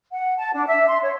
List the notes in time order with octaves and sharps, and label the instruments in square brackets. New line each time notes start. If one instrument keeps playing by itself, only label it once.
[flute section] F#5
A5
D4
E5
C6
C#5